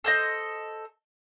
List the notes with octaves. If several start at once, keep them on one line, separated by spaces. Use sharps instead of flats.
A4 C5 D#5